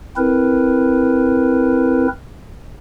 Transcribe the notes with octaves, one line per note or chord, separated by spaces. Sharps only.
C4 E4 A#4 B4